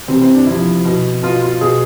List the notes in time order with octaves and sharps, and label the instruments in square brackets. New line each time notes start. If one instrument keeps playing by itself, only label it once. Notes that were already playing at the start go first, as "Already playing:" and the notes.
[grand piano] C3 E3 C4
C4
D4
C3 F3 E4
B2
B2 F4
F4
B2 G#4